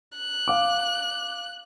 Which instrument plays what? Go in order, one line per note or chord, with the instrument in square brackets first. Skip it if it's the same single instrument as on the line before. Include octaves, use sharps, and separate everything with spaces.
[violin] F#6
[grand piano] F5 D6